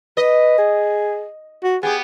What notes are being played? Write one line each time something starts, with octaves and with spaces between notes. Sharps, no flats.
B4 D#5
G#4
F#4
B3 G4 G#4